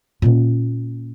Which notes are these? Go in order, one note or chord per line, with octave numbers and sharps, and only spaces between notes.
A#2 C#4